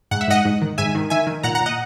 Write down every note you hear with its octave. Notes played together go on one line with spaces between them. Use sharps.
G#2 F#5
E5
G#2 D#5 F#5
G#2
D#3
G#2 E5 G#5
D#3
D#3 E5 G#5
D#3
A#2 F#5 A#5
F#5 A#5
A#2
D#5 F#5